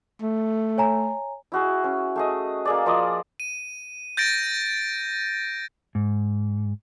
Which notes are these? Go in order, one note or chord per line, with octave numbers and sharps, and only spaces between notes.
A3
C#5 G#5 A#5
E4 F#4 G#4
C#4
A3 G#4 D#5
A#3 G#4 D5
F3 A#4 D5 D#5
D#7
G6 A6 A#6 D7
G#2